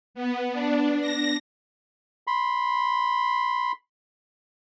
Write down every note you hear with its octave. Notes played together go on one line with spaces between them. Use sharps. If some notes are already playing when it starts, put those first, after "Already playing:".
B3
D4
A#6
B5 C6